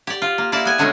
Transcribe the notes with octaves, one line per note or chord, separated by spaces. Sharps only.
G4 D5
F4
A#3
A#3 E4 D5 E5
B3 G#5
B2 D3 F#3 G#3 A3 C#4